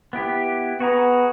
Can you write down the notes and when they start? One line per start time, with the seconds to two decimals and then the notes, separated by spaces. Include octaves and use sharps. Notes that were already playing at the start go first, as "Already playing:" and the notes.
0.13 B3 E4 G4
0.80 B3 F#4 G#4 A#5